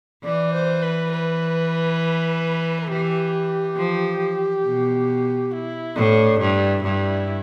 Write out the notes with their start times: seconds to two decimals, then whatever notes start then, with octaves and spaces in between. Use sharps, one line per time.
0.24 E3 D5
0.53 C5
0.83 B4
1.12 B4
2.88 G4
3.77 F3
4.64 B2
5.52 E4
5.96 A2 D4
6.40 G2 E4
6.84 G2